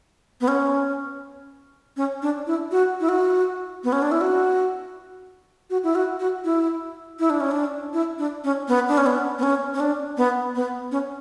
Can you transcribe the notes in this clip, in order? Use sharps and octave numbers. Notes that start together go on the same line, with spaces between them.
B3
C#4
C#4
D4
E4
F#4
E4
F#4
B3
C#4
D4
E4
F#4
F#4
E4
F#4
F#4
E4
E4
D4
C#4
D4
E4
D4
C#4
B3
D4
C#4
B3
B3
C#4
C#4
D4
B3
B3
C#4